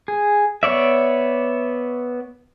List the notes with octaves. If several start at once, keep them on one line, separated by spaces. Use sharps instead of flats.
G#4
B3 C#5 D5 E5